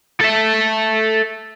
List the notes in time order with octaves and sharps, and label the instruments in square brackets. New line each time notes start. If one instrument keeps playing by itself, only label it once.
[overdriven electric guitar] A4 E5